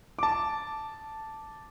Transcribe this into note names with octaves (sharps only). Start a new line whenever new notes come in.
A5 D6